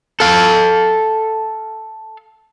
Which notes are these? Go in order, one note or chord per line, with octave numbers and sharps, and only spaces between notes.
A4 F5